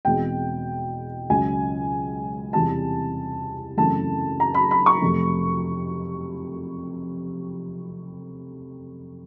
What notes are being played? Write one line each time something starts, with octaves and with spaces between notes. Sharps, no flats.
E2 B2 G#3 C4 G5
C#2 C#3 F#3 G#5
E2 C3 E3 G3 C4 A5
F#2 C#3 E3 A3 C4 A5
A#5
B5
B5
C#6
F2 C3 F3 A3